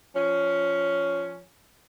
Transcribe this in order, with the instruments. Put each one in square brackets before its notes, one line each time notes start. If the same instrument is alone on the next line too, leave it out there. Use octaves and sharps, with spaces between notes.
[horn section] F3 C#4